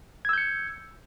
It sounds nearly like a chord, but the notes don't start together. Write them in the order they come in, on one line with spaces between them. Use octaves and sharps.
G#6 E6 G6 C#7